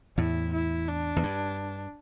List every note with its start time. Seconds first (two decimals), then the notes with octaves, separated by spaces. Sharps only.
0.18 E2 A2 E4
0.53 E4
0.88 D4
1.16 E2
1.23 G2